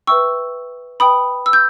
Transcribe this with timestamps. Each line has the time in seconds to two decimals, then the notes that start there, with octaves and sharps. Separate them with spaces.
0.07 B4 E5 G5 C#6 E6
1.00 B4 G5 B5 D#6
1.46 E6
1.53 G6